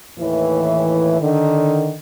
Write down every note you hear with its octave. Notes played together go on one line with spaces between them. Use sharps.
D#2 A2 E3
D3 D#3